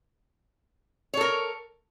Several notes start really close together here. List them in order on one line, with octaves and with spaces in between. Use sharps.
C#5 A4 A#4